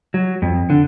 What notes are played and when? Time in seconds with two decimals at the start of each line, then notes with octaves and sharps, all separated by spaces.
0.14 F#3
0.42 F2
0.70 D3